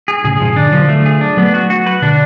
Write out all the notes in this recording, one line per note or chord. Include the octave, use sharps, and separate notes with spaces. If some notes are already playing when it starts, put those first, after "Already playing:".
G#4
A2 C#3 G#4
G#2 B2 F3
B2 D3 D4
D3 F3 F#3
A3
G#4
D4
F#3 A3 B3
F#4
F#4
B4
B2 D3 D4